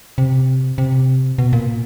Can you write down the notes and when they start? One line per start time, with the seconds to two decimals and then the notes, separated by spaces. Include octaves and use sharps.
0.18 C3
0.78 C3
1.38 B2
1.53 A#2